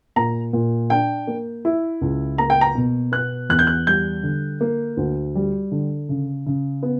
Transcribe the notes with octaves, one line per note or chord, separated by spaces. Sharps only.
A#2 A#5
A#2
D4 G5
A#3
E4
C#2
A#3 A#5
G5
A#5
B2
B3 F#6
E2 F#6
G6
F#6
G3 G6
D3
A#3
D2
G3
D3
C#3
C#3
B3